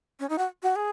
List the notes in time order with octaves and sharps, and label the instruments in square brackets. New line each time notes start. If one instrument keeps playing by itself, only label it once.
[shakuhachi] C#4
D#4
F#4
F#4
G#4